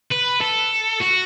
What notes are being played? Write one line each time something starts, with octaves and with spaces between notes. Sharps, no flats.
B4
A4
F#4